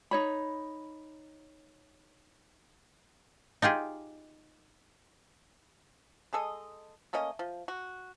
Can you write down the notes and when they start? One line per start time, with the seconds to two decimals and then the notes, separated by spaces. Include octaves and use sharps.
0.11 D#4 C#5 B5
3.62 D#4 F4 G4 G#4
6.33 G#3 G#4 A4 D#5
7.13 A3 A#3 C#4 D#5
7.39 F3
7.68 F#4